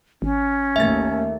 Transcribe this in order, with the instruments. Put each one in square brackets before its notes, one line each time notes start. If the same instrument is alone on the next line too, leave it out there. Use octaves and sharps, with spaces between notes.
[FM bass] G#1 [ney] C#4
[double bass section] D#2 A3 A#3 [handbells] E5 A6